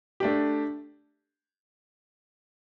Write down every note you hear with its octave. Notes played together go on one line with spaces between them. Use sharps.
A3 D4 G4